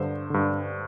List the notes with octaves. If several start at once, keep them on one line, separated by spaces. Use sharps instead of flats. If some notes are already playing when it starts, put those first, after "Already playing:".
Already playing: G2 D3 C5
G2 D3